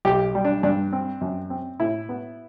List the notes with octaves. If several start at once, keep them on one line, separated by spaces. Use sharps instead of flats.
B1 G4
G3
D4
G2 D4
C4
F#2
C4
A2 E4
B3